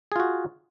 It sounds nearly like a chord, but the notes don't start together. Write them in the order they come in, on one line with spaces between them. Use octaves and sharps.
G#4 F4 F#4